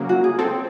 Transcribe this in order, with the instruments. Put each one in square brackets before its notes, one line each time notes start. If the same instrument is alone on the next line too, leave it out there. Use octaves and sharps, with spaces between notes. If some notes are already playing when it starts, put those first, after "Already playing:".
Already playing: [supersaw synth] C#3 F#3 A#3
[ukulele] F#4
G#4
[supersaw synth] C4 [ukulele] A4